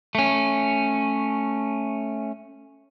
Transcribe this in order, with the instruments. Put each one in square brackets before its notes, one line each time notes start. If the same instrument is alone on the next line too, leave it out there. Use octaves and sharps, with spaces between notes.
[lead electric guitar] A3 C#4